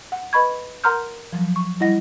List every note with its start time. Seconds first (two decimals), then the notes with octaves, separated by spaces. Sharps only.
0.12 F#5
0.33 B4 D#5 B5 C#6 G#6
0.84 A#4 F#5 A#5 C6 F6 G6
1.33 F3 F#3
1.56 C#6
1.80 G3 E4 D#5 F#5 A#6